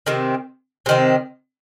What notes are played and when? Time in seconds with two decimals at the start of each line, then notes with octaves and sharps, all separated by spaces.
0.06 C3 D#3 C4
0.86 C3 D#3 C4